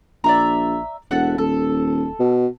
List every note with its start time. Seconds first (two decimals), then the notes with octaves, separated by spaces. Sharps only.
0.24 A#1 D5 E5 A#5
1.11 E1 A4 E5 F#5
1.38 D#1 A4
2.20 B2